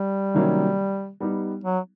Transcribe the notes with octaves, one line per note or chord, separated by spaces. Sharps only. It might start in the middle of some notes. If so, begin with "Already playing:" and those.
Already playing: G3
C3 D#3 F#3 A#3 C#4
G3 B3 D#4 G4
F#3